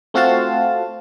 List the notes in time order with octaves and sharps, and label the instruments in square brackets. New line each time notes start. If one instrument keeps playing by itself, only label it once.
[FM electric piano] A3 C4 F4 F#4 F5 A5